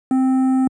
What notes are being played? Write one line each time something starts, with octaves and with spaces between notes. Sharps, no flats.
C4